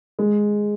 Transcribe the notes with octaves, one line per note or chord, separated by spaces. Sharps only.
G#3